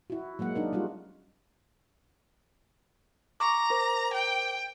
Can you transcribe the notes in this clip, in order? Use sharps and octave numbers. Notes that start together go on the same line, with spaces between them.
E4 F#4
F#3 G#3 A#3 F#5
D4 D#4 A#4
G3 G#3 C#4 D#4 F4 F#4
A#5 C#6 D6
A#4 C5 D6
G5